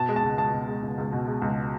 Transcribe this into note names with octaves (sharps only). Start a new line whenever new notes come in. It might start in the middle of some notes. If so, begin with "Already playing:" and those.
Already playing: B2 A5
G#3
A5
C#2
C#2 A5
B2
G#3
C#2
C#2
B2
G#3
C#2